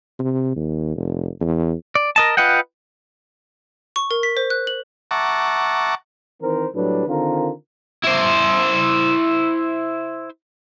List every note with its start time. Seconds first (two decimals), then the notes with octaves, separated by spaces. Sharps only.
0.19 C3
0.56 D#2
0.96 F1
1.41 E2
1.95 D5
2.16 A#4 D#5 A5
2.37 F4 B4 D#5 F#5 G5
3.96 C#6
4.11 A#4
4.23 B6
4.37 C5
4.50 F#6
4.67 F#7
5.11 E5 F#5 A5 A#5 C#6 D6
6.41 D#3 E3 C4 A#4 C5
6.74 A2 F#3 G3 D4 B4
7.07 D3 D#3 C4 F4 A#4
8.04 E4 C5